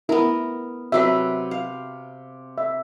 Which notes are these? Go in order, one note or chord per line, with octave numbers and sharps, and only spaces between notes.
B3 E4 A#4
C3 F#3 B4 E5
F5
E5